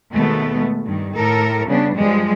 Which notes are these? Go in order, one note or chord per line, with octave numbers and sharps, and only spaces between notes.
D#2 B2 G#3 A3 B3
G2 D#3
A2 A4 A#4
C#3 G3 B3 D4
G2 F3 G3 G#3